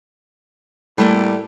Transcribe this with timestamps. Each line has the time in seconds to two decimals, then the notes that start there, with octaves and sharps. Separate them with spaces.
0.98 A2 G3 A3 A#3